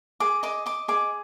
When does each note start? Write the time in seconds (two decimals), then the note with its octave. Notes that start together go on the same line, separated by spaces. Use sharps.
0.20 G#4 D6
0.43 D#5 D6
0.66 D#5 D6
0.88 G#4 D6